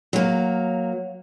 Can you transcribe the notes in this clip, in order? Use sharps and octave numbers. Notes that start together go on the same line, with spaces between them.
F#3 A#3